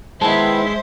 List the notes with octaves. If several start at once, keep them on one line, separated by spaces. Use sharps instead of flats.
D#3 G#3 B3 E4 C5 E5 A5